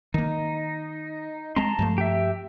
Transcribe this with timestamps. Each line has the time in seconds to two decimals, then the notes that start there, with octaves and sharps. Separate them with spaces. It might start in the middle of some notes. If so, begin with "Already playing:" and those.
0.14 D#3 A#3 D#4
1.56 G#3 C4 A5 A#5 C6
1.79 G2 F3 A3
1.98 G4 E5